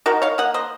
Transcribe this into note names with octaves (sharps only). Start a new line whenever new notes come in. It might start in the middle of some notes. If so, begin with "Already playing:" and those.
D#3 F#4 A#4
C#5 F5
A#3 D#5 F#5
C5 D#5